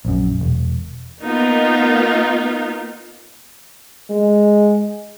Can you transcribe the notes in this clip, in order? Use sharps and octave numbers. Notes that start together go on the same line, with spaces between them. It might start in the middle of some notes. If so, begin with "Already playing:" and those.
A#1 F#2
E1
A#3 B3 D#4 F4
G#3